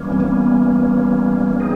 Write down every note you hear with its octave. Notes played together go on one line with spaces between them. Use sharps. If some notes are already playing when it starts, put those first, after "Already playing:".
Already playing: E3 G3 A#3 C#4
C4
B3
E3 G3 C4 D#4 G#4